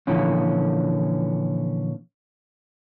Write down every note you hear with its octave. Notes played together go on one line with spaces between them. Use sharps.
A#2 D3 E3 F3 C#4